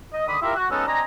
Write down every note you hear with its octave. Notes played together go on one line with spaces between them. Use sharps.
D#5
D3 D#3 D5 B5 D#6
E4 F4 G4 A#4 E5
F#4
G#3 B3 C#4 D#4 F#4 A4
C4 D4 D#5 G#5 A#5